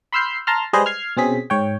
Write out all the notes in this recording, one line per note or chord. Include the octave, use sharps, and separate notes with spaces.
B5 C6 E6 F6 G6 C7
A5 A#5 C6 F6
G3 G#3 G#4 B4 C5 D#5
F6 G#6 C7
B2 C4 C#4 G#4 B6
G#2 C#5 G5